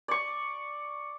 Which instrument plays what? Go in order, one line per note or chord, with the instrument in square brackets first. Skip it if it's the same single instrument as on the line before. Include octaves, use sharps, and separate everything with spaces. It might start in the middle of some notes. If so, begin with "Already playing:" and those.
[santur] D5 C#6